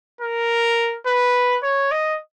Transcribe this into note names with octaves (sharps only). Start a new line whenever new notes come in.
A#4
B4
C#5
D#5